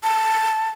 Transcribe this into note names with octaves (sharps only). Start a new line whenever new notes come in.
A5